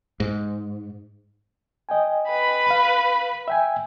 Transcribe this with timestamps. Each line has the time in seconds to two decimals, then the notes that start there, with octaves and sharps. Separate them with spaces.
0.20 G#2
1.89 D#5 G5 G#5
2.29 B4 B5
2.70 F5
3.48 E5 G5 G#5